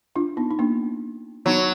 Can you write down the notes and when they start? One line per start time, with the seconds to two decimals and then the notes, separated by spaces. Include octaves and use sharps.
0.16 D4 F4
0.37 B3 D#4
0.51 D#4
0.59 A#3 D4
1.46 F#3 B3 D#4